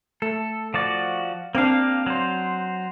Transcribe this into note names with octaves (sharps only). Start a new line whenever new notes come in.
A3 A4
F3 F#4 D5
A#3 C4 D4 G4 F5
F#3 C5